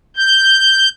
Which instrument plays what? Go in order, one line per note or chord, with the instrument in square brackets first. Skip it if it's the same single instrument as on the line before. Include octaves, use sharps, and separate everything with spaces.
[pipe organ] G6